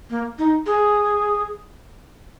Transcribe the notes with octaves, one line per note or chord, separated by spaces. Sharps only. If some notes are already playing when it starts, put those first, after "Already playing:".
A#3
D#4
G#4